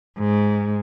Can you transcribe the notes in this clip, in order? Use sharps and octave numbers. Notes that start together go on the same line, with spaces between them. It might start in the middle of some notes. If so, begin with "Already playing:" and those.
G#2